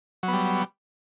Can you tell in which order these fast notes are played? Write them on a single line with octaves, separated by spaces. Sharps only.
F#3 B3 G3